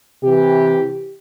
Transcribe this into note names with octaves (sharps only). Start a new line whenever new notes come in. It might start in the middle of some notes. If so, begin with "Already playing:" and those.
C3 E3 G4